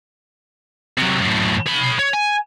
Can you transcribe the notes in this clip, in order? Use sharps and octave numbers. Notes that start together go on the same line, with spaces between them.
C3 F#3
F#2 A2
C#5 B5
C#5
G#5